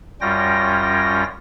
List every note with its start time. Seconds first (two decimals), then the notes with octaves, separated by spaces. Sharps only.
0.21 F#2 G3 C#4 F4 G5 A#6